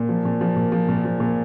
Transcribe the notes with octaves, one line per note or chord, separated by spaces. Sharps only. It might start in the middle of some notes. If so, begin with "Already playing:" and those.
Already playing: A#2
F3
A#2
F3
A#2
F3
A#2
F3
A#2